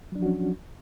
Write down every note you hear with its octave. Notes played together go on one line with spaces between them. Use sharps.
F3 F#3 C#4 D4 F#4